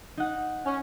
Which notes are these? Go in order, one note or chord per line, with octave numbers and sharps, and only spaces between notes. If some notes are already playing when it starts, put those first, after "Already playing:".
D#4 F#5
C#4